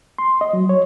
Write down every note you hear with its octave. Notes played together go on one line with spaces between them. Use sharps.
C6
D#5
F#3
C#5